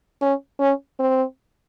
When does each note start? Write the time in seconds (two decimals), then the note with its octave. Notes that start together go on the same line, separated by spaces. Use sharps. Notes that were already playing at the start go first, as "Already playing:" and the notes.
0.22 C#4
0.60 C#4
1.00 C4